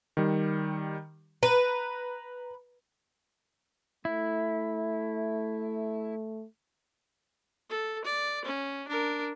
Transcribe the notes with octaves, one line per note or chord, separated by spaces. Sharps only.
D#3 G3
B4 A#5
A3 E4
A4
D5
C#4
D4 A#4